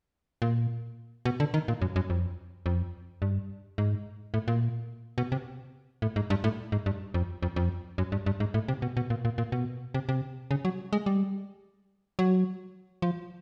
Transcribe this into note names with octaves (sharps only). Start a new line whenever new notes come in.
A#2
B2
D3
D#3
A#2
F#2
F#2
F2
F2
G2
G#2
A2
A#2
B2
C3
A2
G#2
G2
A2
G#2
G2
F2
F2
F2
F#2
G2
G2
G#2
A2
C3
B2
B2
A#2
A#2
A#2
B2
C3
C3
C#3
F#3
G#3
G3
F#3
F3